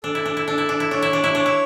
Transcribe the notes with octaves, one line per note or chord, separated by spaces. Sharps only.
D4 A4
E4
D4
E4
D4 A4
E4
D4
E4
D4 C#5
E4
D4
E4
D4 C#5
E4